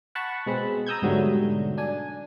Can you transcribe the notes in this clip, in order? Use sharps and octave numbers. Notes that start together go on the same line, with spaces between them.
F#5 A5 B5 C#6
B2 G#3 C4 B5
A#5 D#6 E6 G6 G#6
G#2 B2 D3 F#3 G3 A3
D4 G#5